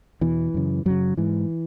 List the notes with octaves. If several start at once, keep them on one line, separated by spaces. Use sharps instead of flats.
E2 B2 E3
F#2 C#3
F#2 C#3 F#3
G#2 E3